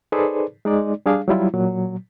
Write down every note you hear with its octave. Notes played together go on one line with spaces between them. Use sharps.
D#4 G#4 A4 B4 C5 D5
G#3 D#4 D5
G3 D4 G#4 F5
F#3 G3 E4 F4
A#2 F#3